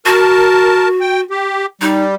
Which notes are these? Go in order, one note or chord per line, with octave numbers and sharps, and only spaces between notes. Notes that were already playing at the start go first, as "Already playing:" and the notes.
F#4 A#4 A5
G5
G4
G3 D#4